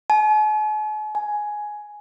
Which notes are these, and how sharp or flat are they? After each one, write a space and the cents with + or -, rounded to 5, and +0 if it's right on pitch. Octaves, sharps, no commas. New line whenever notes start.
G#5 +45
G#5 +10